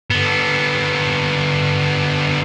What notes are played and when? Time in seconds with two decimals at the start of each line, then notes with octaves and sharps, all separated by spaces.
0.10 D3 B3